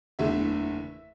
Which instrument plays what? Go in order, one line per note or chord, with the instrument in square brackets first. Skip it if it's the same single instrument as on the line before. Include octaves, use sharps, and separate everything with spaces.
[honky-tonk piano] F#1 E2 D3 A3 E5